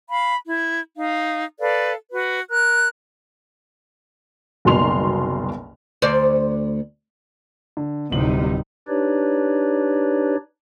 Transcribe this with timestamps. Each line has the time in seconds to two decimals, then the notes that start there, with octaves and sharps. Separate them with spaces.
0.09 F5 B5
0.47 E4
0.97 D#4 F5
1.60 A4 B4 D5 F5
2.11 F#4 B4
2.49 A#4 F#6
4.65 F#1 C2 B2 D#3 C6 F7
6.02 D2 C5 D5
7.77 D3
8.12 D1 C3 G3 D#4 F#7
8.88 D4 D#4 G4 B4 C#5 D5